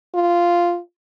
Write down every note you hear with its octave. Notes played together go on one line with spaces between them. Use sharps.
F4